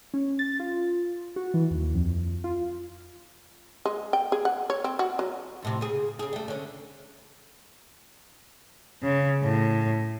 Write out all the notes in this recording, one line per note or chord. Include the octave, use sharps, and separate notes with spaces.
C#4
A6
F4
F#4
E3
D#2
F2
F4
G#3
G5
G#4
F#5
C#5
C4
F#4
F#3
F2 A2 C3
C#3 G#4
C#3 G#4
G3 A3
D3 C#4
C#3
A2